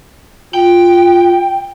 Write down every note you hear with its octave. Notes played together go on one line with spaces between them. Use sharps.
F4 G5